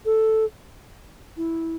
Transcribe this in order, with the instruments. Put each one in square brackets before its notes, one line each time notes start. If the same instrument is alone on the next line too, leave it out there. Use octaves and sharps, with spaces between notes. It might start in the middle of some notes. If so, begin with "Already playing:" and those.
[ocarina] A4
E4